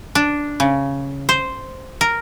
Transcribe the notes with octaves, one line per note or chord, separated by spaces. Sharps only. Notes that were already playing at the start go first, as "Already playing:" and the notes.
D4
C#3
C5
A#4